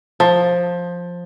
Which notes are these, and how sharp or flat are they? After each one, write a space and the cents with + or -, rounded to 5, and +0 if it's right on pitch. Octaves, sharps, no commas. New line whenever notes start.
F3 +10